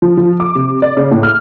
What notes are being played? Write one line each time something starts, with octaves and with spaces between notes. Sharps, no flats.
F3
F3
D6
C3
D5
C#3
A2
F6